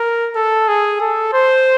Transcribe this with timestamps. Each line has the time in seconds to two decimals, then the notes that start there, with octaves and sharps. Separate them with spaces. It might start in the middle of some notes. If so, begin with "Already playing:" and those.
Already playing: A#4
0.35 A4
0.68 G#4
1.01 A4
1.33 C5